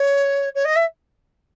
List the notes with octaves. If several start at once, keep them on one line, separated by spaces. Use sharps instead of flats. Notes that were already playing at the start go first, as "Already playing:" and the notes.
Already playing: C#5
C#5
D#5
E5